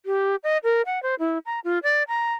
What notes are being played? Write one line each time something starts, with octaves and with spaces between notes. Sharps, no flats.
G4
D#5
A#4
F#5
C5
E4
A#5
F4
D5
A#5